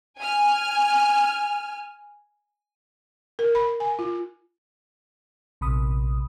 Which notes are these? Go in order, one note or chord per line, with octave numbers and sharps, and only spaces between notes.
G#5 F6
A#4
B5
G#5
F4
A#1 C3 B5 D#6